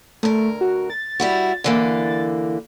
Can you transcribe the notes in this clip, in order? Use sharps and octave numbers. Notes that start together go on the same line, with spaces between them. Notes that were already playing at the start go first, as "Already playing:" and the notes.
D2 A3 A#4
F#4
A6
G3 E4 F#4
D3 E3 A#3